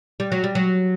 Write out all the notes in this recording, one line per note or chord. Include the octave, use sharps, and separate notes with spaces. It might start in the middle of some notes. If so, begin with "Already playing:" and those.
G3
F#3
G3
F#3